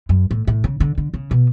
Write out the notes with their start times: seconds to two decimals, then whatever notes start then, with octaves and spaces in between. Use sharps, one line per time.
0.09 F#2
0.31 A2
0.47 A2
0.64 C#3
0.80 D3
0.98 D3
1.14 C#3
1.31 B2